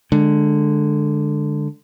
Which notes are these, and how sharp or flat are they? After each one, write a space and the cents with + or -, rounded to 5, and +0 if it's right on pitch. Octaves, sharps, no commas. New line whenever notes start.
D3 +10 G#3 +0